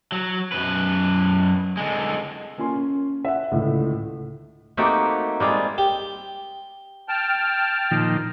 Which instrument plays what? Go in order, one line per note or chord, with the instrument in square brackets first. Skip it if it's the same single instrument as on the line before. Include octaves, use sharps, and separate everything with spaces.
[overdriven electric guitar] F#3
F#2 B4
D3 G#3
[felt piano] A#3 C#4 F4 G#5 C6
C#4
E5 F#5
C#2 A2 D3
[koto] A3 A#3 C4 D#4 F#4 G4
G3 G#3 C4 F4
[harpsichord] G4
[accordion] G5 A5 F6
[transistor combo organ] A#2 D#3 F3